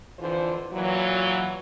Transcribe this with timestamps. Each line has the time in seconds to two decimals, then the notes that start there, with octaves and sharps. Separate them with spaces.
0.18 F2 D3 E3 F4 C5
0.72 A#2 E3 F#3